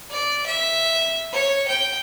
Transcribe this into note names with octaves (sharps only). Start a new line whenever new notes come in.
D5
E5
C#5
G5